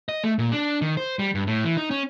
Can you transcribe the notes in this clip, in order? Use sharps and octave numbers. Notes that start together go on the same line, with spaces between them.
D#5
A3
A#2
D4
D#3
C5
G3
G2
A2
E3
D#4
C#4